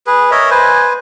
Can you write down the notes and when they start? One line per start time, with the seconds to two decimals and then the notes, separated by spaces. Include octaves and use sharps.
0.07 G#4 B4
0.31 A#4 C#5 D#5 E5
0.50 B4 C5 G#5